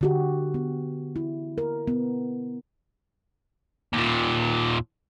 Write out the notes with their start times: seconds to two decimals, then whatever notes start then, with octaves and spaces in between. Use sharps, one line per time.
0.01 D3 F#4 G4
0.54 B3
1.16 E4
1.58 A#4
1.87 B3
3.93 D#2 A#2